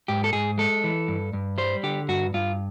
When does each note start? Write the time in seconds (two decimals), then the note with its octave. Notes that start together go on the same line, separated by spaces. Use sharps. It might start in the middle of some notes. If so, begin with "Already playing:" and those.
0.08 G#2 G4
0.24 A4
0.33 G#2 G#4
0.58 G#3 A4
0.84 E3
1.08 G2
1.33 G2
1.58 G3 C5
1.83 D3 G4
2.09 G2 F#4
2.34 G2 F4